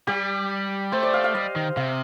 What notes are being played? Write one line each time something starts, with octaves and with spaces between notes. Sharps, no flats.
G3 G4
A3 C5
D5
F5
F5
G3 D#5
D#3
C3 F5